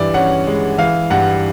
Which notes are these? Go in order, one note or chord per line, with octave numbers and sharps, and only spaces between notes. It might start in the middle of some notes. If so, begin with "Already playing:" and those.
Already playing: G2 E3 D5
C#4 F#5
G#3
E3 F5
G2 F#5